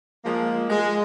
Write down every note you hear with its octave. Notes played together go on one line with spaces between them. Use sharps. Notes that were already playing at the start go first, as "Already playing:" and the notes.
F3 G#3 A#3
G#3